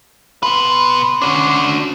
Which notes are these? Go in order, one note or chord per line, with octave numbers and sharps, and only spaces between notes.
B2 B4 C6
C#4 D4 F#4